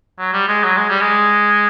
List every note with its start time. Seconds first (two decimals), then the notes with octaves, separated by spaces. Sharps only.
0.19 F#3
0.33 G3
0.48 G#3
0.64 F#3
0.77 G#3
0.89 G3
1.01 G#3